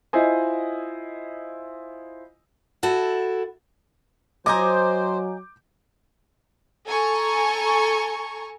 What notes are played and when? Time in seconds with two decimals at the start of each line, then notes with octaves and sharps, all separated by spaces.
0.13 E4 F4 C5 D#5 G#5
2.83 E4 F#4 A4
4.46 F#3 C5 D#5 G#5 A#5 D6 G6
6.88 A4 G#5 A#5 C#6